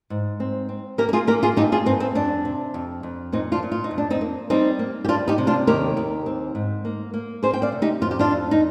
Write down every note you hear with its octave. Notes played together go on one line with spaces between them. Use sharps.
G#2
C4
C4
A#3 G4 A#4
A#4
F4 G#4
A#3 G4 A#4
F4 G#4
G2 D#4 G4
F4 G#4
G2 C4
C4
F2 D4
C3
F2
F2
A#2 C4 D#4
D4 F4
A#2
F4
D#4
F2
D4
C4 D#4
A#3
G3 C4 D#4
A#3
G4
G3 D4 F4
D#4 G4
C3
D4 F4
D#2 G4 A#4
D#2
C4
G#2
A#3
A#3
C4 G#4 C5
G5
D5 F5
C3
D#4 G4
F2 F4
G4
D4 F4
F2
D#4